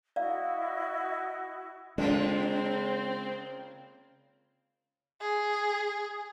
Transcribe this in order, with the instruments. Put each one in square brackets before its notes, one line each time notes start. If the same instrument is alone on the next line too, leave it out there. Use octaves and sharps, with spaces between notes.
[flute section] E4 F#4 D#5 [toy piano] D5 F5
[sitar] C#3 A#3 F4 [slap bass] G#3 [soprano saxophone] C4
[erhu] G#4